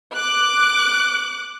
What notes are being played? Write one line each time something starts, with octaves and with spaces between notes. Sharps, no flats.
D6 F#6